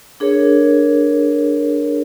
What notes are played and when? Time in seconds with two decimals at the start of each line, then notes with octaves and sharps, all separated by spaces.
0.20 D4 G#4 A#4 C#5